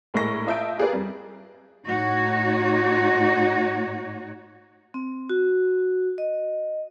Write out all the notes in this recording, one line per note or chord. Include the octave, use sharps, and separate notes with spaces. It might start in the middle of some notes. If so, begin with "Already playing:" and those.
A#1 A2 G#3 A#4 C#6 A#6
F4 D#5 E5 A5 G6 D7
F4 G4 G#4 A#4 B4 D5
F2 G3
A2 D#4 F#4 C#5
C4
F#4
D#5